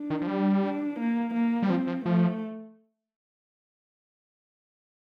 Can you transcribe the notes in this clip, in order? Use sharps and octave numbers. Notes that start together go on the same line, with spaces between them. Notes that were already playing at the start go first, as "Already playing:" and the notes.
Already playing: D4
D#3
F3
G3
D4
A#3
A#3
G3
F3 C4
F3
F3 A3